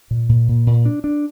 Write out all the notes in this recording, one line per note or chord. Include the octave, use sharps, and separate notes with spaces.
A#2
A#2
A#2
A#2
D4
D4